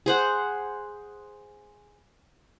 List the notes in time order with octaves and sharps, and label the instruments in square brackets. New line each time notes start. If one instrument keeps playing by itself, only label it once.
[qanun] G#4 C5 F#5